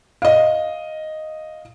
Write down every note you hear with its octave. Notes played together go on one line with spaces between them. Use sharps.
D#5 F5